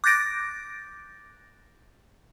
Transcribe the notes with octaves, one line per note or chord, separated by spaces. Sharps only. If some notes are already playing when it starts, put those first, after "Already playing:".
D6 F#6 G6 A6 A#6 D7